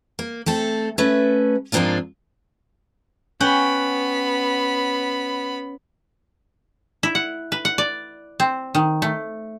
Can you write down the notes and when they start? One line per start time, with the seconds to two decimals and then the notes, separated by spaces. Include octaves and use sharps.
0.19 A#3
0.46 A3 C4 A4
0.98 A3 C#4 B4 E5
1.72 G#2 F3 A#3 C4 D4 F4
3.40 B3 C#4 F#5 G5 B5
7.03 E4
7.15 F#5
7.52 B4
7.65 F#5
7.78 D5
8.40 C4
8.75 D#3
9.02 A3